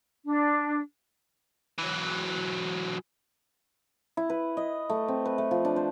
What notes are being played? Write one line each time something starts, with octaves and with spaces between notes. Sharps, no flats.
D4
E3 F#3
E4
B4
D#5
A3
C4
B4
A3
F3
D4
C5